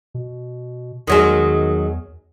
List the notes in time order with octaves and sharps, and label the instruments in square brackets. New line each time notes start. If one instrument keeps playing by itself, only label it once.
[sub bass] B2
[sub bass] E2 [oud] D#3 F#3 G#3